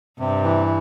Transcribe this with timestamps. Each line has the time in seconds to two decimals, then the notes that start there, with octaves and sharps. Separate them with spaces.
0.19 G2 C3
0.43 E3